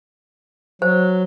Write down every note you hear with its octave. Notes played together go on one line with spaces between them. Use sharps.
F#3 C5